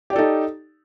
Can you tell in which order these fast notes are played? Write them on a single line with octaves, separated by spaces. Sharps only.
G4 D5 A4 D#4